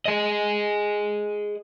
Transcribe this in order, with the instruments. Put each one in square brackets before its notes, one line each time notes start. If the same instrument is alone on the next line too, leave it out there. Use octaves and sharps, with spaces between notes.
[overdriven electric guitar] G#4 D#5